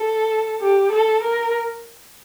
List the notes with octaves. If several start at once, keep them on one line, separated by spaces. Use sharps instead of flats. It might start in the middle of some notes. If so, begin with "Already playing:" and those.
Already playing: A4
G4
A4
A#4